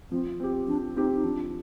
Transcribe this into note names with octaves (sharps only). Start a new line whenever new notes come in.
F3 C4
C4 G4
F3 D4
C4 D#4 G4
D#4
F3 D4